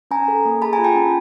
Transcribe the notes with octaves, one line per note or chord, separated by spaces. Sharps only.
C#4 G#5 A#5
A4
A#3
G#4 A5 B5
G#5 A#5
F4
G5 A5
C#4